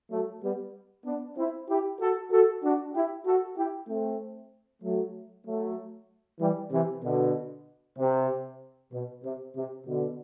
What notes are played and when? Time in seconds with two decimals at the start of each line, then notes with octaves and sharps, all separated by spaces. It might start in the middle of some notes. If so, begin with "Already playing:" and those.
0.11 F#3 A3
0.43 G3 B3
1.05 B3 D4
1.37 C4 E4
1.69 E4 G4
2.00 F#4 A4
2.31 F#4 A4
2.63 D4 F#4
2.94 E4 G4
3.25 F#4 A4
3.57 E4 G4
3.88 A3 C4
4.83 F#3 A3
5.47 F#3 A3
6.40 E3 G3
6.71 C3 E3
7.03 B2 D3
7.98 C3
8.92 B2
9.24 C3
9.56 C3
9.86 B2 D3